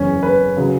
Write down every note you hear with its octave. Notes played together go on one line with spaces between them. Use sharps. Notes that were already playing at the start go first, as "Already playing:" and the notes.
Already playing: F#1 E2 E3 C#4
B4
C#3 F#3